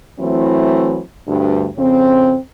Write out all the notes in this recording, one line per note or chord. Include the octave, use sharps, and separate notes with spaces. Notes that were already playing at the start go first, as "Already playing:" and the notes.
E3 F#3 A3 C4 E4
D2 G2
F2 C#3 C4